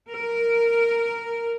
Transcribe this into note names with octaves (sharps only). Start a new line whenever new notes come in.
A#4